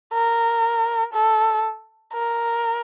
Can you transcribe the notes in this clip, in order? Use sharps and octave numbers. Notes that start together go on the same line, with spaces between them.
A#4
A4
A#4